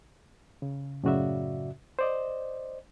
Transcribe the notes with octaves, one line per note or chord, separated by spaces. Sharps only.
C#3
F#2 A2 C#3 F#4 D5 E5
C5 D5 D#5